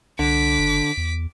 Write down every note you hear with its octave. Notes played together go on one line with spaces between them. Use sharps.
C2 D3 D6 B6
F#1
E2